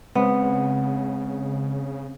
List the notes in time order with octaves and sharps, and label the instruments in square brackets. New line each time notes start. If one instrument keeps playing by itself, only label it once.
[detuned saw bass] C#3 [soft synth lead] G#3 [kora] B3 [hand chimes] C4 C5